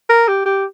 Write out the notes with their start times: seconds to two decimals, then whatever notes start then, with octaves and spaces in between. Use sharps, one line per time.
0.10 A#4
0.28 G4
0.46 G4